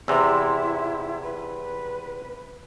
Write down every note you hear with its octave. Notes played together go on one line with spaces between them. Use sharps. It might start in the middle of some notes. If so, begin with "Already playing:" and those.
E2 C3 E4 C6 E6
B4